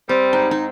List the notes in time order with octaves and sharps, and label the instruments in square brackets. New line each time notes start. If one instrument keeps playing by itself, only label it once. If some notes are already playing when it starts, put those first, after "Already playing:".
[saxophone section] G3 [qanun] C4
[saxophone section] G#2 [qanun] D#4
[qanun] D#4